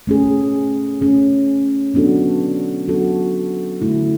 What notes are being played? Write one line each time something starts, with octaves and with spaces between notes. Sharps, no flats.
A3 C#4 G#4
A3 C#4 G#4
F#3 B3 D4 F#4 A4
F#3 B3 D4 F#4 A4
D3 A3 E4